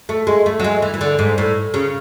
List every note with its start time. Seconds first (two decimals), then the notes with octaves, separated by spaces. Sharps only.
0.09 A3
0.27 G#3
0.46 A3
0.60 F#3
0.64 G#3
0.82 E3
0.94 E3
1.01 D3
1.19 G#2
1.38 A2
1.74 C#3